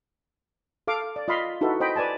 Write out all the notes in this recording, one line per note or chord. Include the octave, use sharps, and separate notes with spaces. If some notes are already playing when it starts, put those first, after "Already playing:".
A4 F5 D6
D5
F4 D#5 F5 B5 C6
D#4 E4 F#4 A4 B4 E5
C5 D#5 G5 B5
B4 D5 G#5 A5